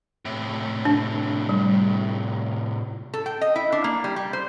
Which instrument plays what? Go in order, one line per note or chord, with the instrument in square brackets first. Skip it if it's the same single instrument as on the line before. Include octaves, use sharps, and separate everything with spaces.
[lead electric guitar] A2 C3
[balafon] D4
G3
[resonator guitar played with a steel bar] A4
G5
D#5
E4
D4
A#3
G3
G3
C5